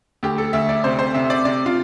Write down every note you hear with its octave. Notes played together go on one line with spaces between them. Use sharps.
D2 G4
A4
D2 E5
D5
C3 C5
C5
C3 E5
D5
C3 D5
F4